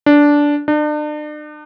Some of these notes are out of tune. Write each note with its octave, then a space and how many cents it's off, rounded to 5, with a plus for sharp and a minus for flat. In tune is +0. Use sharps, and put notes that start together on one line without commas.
D4 -10
D4 +40